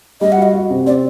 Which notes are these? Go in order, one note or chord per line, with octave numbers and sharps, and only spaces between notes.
G3 D#5
F#5
F#4
D#5
F#4
C3
C4 D5